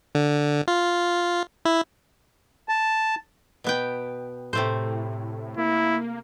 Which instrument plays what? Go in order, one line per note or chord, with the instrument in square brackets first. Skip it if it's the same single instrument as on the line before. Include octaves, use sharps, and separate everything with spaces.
[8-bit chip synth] D3
F4
E4
[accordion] A5
[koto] B2 B3 G5
[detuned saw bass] A2 [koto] C3 A3 C5
[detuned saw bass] A#3 [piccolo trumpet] E4